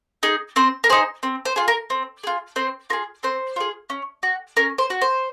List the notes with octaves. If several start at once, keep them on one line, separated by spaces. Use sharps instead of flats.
D#4 G#4
C4 C5
A#4
D#4 G#4 C5
C4
C5
F4 G#4
A#4
C4
F4 G#4
C4 C5
F4 G#4 A#4
C4 C5
F4 G#4
C#4
F#4
C#4 A#4
C5
F#4
C5